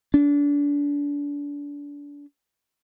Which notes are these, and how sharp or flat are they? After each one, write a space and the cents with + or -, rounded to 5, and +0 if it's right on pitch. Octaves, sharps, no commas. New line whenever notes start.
D4 -30